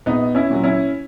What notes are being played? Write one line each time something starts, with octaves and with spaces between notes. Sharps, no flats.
A#1 B3 D#4
C#4 E4
A#2 F#3
C#4 E4